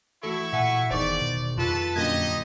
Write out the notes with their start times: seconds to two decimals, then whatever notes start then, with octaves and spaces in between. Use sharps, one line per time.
0.23 E3 A3 E4 F#4 A4 C#6
0.53 A#2 E5 F#5 G#5
0.91 F1 E2 D#3 C5 D5 C#6
1.21 B2
1.58 F2 F4 A4 B4 A5
1.96 F#2 A#2 D3 D#4 G4 D#5 G#6